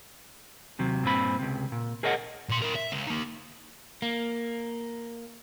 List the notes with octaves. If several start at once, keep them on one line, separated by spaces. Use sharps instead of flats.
D#2 C3 F#3
G2 A#2 C4 B5
C#2 C3
A#2
G#4 A#4 C#5 D#5 E5 F#5
A#2 C6
E4 A#4
E5
C#2
A#3 D#4
A#3